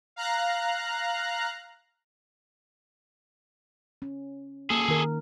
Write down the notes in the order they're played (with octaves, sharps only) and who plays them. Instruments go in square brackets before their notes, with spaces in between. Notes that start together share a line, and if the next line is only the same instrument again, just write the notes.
[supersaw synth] F5 A#5 F#6
[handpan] C#4
[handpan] A#3 [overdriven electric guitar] G#4 A4
[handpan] D#3 A#4